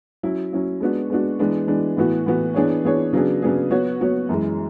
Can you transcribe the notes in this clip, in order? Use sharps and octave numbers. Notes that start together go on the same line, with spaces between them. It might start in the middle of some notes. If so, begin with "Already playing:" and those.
F#3 C#4 E4
F#3 C#4 E4
G#3 B3 D4 F#4
G#3 B3 D4 F#4
E3 G#3 B3 D4
E3 G#3 B3 D4
A2 E3 B3 F#4
A2 E3 B3 F#4
E3 B3 D4 G#4 C#5
E3 B3 D4 G#4 C#5
C#3 F#3 B3 D4 G#4
C#3 F#3 B3 D4 G#4
F#3 B3 F#4 C#5
F#3 B3 F#4 C#5
F#2 E3 G#3